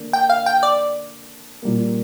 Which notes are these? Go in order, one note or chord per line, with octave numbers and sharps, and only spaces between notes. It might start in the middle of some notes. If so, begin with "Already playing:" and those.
Already playing: D3 A#3 D4
G5
F5
G5
D5
A#2 G3 A#3